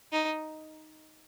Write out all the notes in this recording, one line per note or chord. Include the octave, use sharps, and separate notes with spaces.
D#4